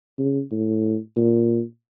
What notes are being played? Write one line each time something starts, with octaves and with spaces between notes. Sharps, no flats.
C#3
A2
A#2